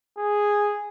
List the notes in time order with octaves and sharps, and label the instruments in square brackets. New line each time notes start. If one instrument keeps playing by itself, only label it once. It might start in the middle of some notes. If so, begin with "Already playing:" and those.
[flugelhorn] G#4